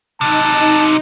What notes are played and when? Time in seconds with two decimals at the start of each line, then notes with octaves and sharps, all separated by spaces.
0.21 C3 F#3 D#4 A5